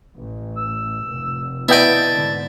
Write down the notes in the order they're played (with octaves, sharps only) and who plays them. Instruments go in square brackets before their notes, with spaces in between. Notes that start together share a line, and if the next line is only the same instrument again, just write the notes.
[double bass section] A1
[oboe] E6
[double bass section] F1
[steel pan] B3 D#5 G5 [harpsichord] E4 D5 [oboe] A5
[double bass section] G#2 D3